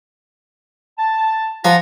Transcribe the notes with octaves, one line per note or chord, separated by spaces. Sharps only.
A5
F3 F4 F#5 G#5 A#5